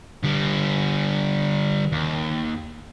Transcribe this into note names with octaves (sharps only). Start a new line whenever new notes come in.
D3 G3
D#2